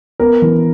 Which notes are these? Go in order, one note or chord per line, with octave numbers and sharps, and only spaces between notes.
B3 A#4
E3